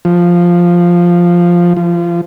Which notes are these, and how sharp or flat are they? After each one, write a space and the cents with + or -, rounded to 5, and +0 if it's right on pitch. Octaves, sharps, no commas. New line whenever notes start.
F3 +0
F3 -25